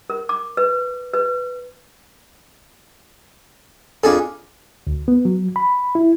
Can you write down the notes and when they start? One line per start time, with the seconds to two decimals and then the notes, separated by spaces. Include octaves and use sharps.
0.10 A#4
0.29 D6
0.57 B4
1.14 B4
4.03 F2 D4 G#4 A4
4.87 D2
5.08 B3
5.25 F#3
5.56 B5
5.95 E4